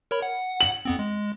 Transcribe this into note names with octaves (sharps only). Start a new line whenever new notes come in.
A#4 C#5 B5
F#5
F#7
F2 B3 C4
G#3